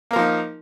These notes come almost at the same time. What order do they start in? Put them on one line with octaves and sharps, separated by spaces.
A#3 A#4 F3 D#4